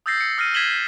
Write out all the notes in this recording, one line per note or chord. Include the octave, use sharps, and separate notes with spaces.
D#6 E6 G6 A6 A#6 C7
C#7
D#6 F6 A#6 C7 D#7
G#6 B6 C7 E7 F#7 G7
B6